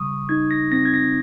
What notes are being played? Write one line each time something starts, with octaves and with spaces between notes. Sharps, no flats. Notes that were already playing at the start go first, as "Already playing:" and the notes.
Already playing: C#3 G3 C#6 D#6
D#4 G#6
A#6
C4 A#6
G#6
A#6